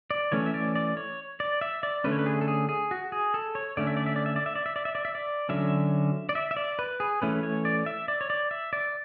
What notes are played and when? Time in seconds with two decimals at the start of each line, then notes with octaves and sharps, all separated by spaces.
0.11 D5
0.32 E3 A3 C#4 C#5
0.46 E5
0.54 D5
0.75 D5
0.97 C#5
1.40 D5
1.61 E5
1.83 D5
2.04 D3 A3 C#4 B4
2.12 C#5
2.19 B4
2.26 G#4
2.41 A4
2.48 G#4
2.69 G#4
2.91 F#4
3.12 G#4
3.34 A4
3.55 C#5
3.77 D3 A3 C#4 D5
3.87 E5
3.97 D5
4.06 E5
4.16 D5
4.26 E5
4.36 D5
4.46 E5
4.56 D5
4.66 E5
4.76 D5
4.85 E5
4.95 D5
5.05 E5
5.15 D5
5.49 D3 F#3 C#4 E5
6.29 D5
6.35 E5
6.51 E5
6.57 D5
6.79 B4
7.00 G#4
7.22 E3 A3 C#4 B4
7.43 C#5
7.65 D5
7.86 E5
8.08 D5
8.21 C#5
8.30 D5
8.51 E5
8.73 D5